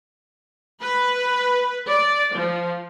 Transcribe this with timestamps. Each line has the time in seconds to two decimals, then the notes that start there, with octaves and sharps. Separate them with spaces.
0.81 B4
1.87 D5
2.34 F3